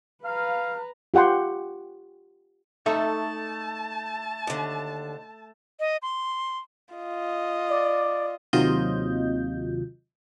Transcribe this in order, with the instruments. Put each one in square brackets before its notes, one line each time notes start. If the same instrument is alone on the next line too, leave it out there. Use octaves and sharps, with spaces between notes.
[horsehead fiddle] B4 A#5 [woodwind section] F5
[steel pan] F4 G4 F#5 G5 C6
[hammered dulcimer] A3 [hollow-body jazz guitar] D#4 A4 E5 [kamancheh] A5
[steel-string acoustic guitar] D#2 D3
[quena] D#5
C6
[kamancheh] F4 D#5
[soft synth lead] D5
[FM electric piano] D#2 C3 F#3 F4 D#5 G6